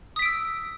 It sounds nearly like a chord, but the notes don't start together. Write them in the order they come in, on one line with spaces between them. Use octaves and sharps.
D#6 B6 D7 E6